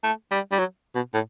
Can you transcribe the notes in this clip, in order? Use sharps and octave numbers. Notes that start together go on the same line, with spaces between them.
A3
G3
G3
F#3
B2
A2